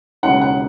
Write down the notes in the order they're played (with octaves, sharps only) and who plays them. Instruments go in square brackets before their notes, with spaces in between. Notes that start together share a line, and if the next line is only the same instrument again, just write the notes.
[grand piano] E1 D#2 C#3 E3 F#5
F#5